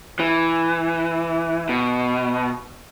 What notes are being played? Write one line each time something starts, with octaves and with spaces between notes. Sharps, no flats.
E3
B2